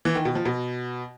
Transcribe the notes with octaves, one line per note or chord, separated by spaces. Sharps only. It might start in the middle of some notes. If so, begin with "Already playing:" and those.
E3
D#3
B2
F3
B2